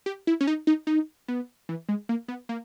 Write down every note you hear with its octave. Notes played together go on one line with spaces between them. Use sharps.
G4
E4
C#4
D#4
D#4
D#4
B3
E3
G#3
A#3
B3
A#3